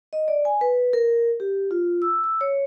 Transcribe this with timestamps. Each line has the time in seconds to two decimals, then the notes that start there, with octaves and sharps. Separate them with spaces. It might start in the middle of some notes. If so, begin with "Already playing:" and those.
0.13 D#5
0.28 D5
0.45 G#5
0.61 B4
0.93 A#4
1.40 G4
1.71 F4
2.02 E6
2.24 E6
2.41 C#5